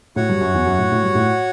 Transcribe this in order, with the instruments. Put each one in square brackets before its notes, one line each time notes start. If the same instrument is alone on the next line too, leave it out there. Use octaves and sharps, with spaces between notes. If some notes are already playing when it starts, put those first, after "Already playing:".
[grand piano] A2 [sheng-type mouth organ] F#4 C#5 F#5
[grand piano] G2
F#2
E2
F#2
A2
A2
G2
A2